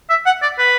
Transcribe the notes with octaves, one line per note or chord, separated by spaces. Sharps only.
E5
F#5
D5
B4